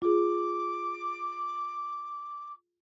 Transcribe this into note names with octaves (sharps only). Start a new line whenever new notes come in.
F4 G#4 D6